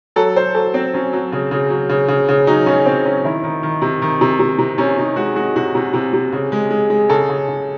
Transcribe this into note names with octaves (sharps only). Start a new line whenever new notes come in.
F#3 A4
F#3 C5
F#3 A4
F#3 C4
F#3 C#4
F#3
C#3
C#3
F#3
C#3
C#3
C#3
F#3 D#4
C#3 C#4
C#3 C4
F#3 C#4
D#3 E4
D#3
D#3
C3
D#3
C3
C3
C3
C3 C#4
C3 D#4
G#3 F#4
G#3 F#4
C3 F#4
C3
C3
C3
C#3
G#3
G#3
G#3
C#3 A4
C#3
C#3